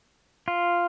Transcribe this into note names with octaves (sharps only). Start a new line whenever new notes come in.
F4